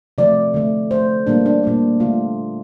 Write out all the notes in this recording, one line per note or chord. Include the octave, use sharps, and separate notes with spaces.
C3 F3 A3 D5
D3 A3
D3 A3 C5
A#2 G3 A#3 D4
D4
A#2 G3 A#3
D3 A3 F4